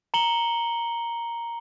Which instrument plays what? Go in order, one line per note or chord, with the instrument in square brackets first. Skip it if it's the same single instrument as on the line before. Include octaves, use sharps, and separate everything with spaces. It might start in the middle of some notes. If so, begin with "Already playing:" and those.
[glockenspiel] A#5 C#7 F#7 G7